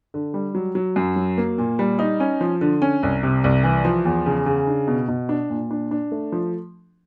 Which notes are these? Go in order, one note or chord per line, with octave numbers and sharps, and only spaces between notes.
D3
G3
F#3
F#3
F#2
F#3
A#3
A#2
G3
D#4
C#4
F3
D3
C#4
C2
C3
C2
E3
F3
E2
C#3
C#3
D4
B2
B2
D4
A#2
D4
D4
A3
F3